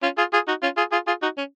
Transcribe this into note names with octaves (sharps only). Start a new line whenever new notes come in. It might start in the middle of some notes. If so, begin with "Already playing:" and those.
C#4 F4
F4 G#4
F4 G#4
D#4 F#4
C#4 F4
F4 G#4
F4 G#4
F4 G#4
D#4 F#4
C#4